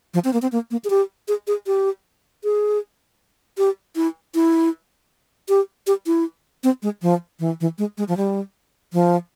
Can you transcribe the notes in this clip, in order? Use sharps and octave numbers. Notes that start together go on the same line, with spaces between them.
F3
C4
A#3
C4
A#3
A#3
G#4
G4
G#4
G#4
G4
G#4
G4
E4
E4
G4
G4
E4
C4
G#3
F3
E3
E3
G#3
G#3
F3
G3
F3